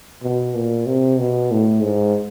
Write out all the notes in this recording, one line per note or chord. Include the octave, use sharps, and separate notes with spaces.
B2
A#2
C3
B2
A2
G#2